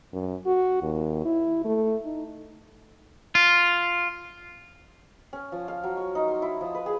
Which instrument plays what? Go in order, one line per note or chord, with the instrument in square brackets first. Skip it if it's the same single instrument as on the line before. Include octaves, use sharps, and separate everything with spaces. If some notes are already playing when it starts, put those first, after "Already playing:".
[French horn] F#2
F#4
D#2
E4
A3
D#4
[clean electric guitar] F4
[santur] C#4
F3
F5
F#3
C#6
D#4
C6
E4
F3
B4
G#4